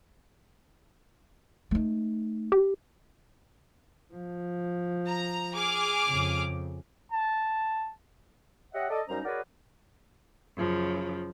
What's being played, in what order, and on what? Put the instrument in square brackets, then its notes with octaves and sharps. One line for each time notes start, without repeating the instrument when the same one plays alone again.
[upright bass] A3 D#4
[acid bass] G4
[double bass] F3
[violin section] A#5
G#4 D6 F6
[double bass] F2 C#3
[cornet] A5
[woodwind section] G4 C#5 D#5 E5 F#5
A4 D5 D#5
F#2 G3 C#4 D#4 C5 A#5
F#4 G#4 A#4 B4 C#5 D5
[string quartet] F#2 C#3 F3